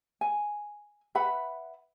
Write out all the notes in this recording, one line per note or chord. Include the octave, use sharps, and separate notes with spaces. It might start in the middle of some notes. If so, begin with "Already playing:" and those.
G#5
B4 E5 F#5 B5